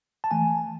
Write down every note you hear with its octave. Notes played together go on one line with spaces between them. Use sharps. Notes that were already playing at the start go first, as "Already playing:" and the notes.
A5
E3 A3 G#5